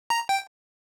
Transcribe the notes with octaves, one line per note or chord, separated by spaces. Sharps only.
A#5
G5